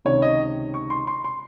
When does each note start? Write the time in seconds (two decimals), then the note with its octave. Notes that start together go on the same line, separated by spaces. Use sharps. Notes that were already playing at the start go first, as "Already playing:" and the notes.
0.05 C#2 C3 D#3 C#5
0.22 D#5
0.74 C#6
0.90 C6
1.07 C6
1.24 C6